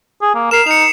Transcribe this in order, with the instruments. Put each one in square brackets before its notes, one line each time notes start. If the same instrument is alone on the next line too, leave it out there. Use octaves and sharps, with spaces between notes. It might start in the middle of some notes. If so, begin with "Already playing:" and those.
[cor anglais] G#4
A#3
[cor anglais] A#4 [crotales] C7 E7
[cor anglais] D#4 [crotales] C#7 F7